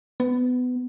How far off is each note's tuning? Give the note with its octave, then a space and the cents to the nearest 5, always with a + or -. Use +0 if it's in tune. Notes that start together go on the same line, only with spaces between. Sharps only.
B3 +20